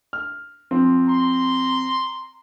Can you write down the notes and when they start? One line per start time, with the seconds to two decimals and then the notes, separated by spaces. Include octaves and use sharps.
0.13 F6
0.71 F3 C4
1.07 A#5 C6